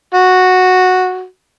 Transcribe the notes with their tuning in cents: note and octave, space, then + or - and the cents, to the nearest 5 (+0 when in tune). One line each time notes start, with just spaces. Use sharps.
F#4 -5